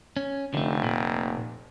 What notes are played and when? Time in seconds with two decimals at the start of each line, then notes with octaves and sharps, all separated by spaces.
0.17 C#4
0.54 F1 D3 A3
0.83 A#2